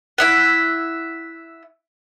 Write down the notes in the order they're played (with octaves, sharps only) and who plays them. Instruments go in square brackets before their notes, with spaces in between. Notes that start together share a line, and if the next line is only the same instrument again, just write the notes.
[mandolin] E4 E5 F#5